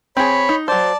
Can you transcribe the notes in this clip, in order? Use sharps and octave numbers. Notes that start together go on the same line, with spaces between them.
C4 G#4 C#5 B5
D#4
F#3 C5 D5 A5